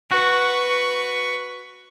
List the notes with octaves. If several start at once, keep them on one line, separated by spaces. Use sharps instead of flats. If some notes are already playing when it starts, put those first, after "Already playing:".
F#4 B4 C#6